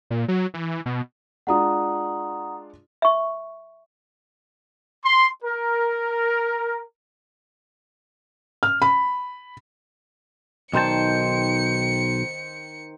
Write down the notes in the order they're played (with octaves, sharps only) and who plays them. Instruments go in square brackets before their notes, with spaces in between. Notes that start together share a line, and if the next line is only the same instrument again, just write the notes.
[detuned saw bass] A#2
F#3
E3
B2
[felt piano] G#3 D4 F4 [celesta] F#5 A#5 D#6
[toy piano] E5 C#6
[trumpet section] C6
A#4
[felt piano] F6
B5
[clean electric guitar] B1 A5 [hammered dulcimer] D#3 C5 G5 [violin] C#7